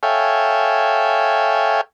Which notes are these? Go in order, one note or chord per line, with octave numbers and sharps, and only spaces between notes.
A4 C#5 E5 F5 G5 G#5